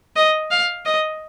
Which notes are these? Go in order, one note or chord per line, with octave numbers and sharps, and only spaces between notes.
D#5
F5
D#5